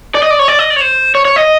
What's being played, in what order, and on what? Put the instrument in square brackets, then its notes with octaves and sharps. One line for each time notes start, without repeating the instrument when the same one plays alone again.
[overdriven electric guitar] D5
D#5
D5
C#5
D5
D#5
D5
C#5
C5
C#5
C#5
D#5